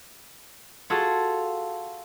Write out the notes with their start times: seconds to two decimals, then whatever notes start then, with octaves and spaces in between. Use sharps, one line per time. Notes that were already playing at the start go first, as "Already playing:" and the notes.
0.90 F4 F#4 G#4 A4